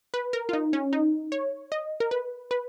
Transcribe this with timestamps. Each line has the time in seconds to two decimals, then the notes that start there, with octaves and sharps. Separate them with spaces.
0.14 B4
0.33 A#4
0.49 F4
0.53 D#4
0.73 C#4
0.93 D#4
1.32 C#5
1.72 D#5
2.00 A#4
2.11 B4
2.51 B4